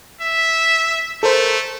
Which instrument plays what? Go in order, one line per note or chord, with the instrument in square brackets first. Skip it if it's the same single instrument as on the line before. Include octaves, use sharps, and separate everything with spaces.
[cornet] E5
[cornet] A3 [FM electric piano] A4 A#4 C5